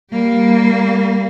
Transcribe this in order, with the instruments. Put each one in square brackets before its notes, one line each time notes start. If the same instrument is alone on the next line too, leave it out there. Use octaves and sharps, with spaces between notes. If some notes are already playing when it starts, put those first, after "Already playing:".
[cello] G3 A#3